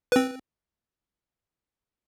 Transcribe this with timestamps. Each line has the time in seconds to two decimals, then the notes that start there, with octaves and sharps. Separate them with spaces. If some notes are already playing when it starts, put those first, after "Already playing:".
0.12 C4 B4